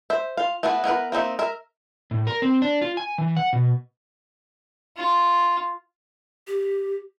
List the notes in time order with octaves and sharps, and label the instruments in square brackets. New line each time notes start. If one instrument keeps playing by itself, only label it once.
[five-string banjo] C5 E5
F4 F5
A3 B3 E4 F#4 B4
B3 E4 A#4 B4
A#3 C4 D#4 E5
A#4 E5
[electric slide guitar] A2
A#4
C4
D4
F4
G#5
E3
F#5
B2
[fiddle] F4
[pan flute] G4